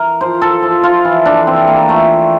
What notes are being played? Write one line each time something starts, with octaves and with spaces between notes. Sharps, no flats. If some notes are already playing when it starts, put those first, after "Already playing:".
Already playing: E3 A#4
F3 C5
A4
F3
F4
E3
D4
E3 C4
A#3
F3 A3